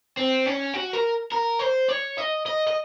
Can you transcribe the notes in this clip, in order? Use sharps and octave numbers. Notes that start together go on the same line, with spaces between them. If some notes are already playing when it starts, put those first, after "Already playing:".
C4
C#4
F#4
A#4
A#4
C5
C#5
D#5
D#5
D#5